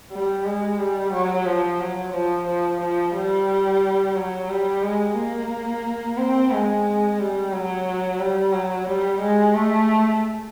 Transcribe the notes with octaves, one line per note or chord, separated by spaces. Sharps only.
G3
G#3
G3
F#3
F3
F#3
F3
F3
F3
G3
F#3
G3
G#3
A#3
C4
G#3
G3
F#3
G3
F#3
G3
G#3
A3